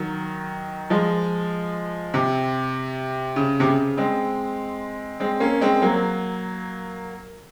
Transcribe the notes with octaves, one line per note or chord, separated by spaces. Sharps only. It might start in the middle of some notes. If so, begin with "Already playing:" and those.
Already playing: D#3 F#3
F3 G#3
C3
C#3
C3
C#3
G#3 C4
G#3 C4
A#3 C#4
G#3 C4
F#3 A#3